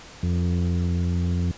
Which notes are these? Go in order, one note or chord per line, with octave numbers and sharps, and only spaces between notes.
F2